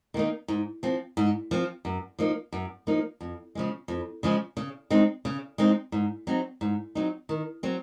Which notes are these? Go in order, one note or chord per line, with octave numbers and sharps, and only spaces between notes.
D#3 A#3 D#4
G#2
F3 C4
G#2
F3 C4
F#2
F3 A#3 D#4
F#2
F3 A#3 D#4
F2
C#3 F3 G#3
F2
C#3 F3 G#3
C#3
G#3 C4 D#4
C#3
G#3 C4 D#4
G#2
F#3 C4 D#4
G#2
F#3 C4 D#4
D#3
F#3 C4